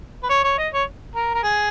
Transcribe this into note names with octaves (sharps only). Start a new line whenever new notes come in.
B4
C#5
C#5
D#5
C#5
A#4
A#4
G#4